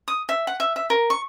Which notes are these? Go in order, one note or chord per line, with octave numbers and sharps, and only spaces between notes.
D#6
E5
F#5
E5
E5
A#4
C#6